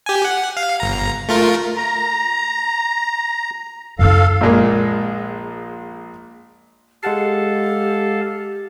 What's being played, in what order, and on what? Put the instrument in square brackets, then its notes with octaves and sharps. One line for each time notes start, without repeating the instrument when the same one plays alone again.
[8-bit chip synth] G4 G#5
F#5
F5
G1 A#5
A3 F4 A#4
[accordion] A#5
[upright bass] F#2 E4 [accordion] A4 F5
[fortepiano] A#1 A#2 G#3 A#4
[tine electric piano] G#3 F#5 C7 [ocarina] G4 [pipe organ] A4 F5 A5